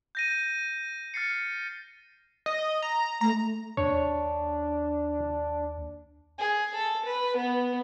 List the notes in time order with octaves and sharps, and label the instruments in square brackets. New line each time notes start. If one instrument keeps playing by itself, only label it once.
[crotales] G6 A#6 D#7
F6 A6 C7 C#7
[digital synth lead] D#5
A#5
[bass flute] A3 [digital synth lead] A#5
[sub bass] D#2 [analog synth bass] D4 [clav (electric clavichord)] C#5
[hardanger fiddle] G#4
A4
B4
B3